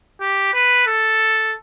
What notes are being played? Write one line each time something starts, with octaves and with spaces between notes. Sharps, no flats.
G4
B4
A4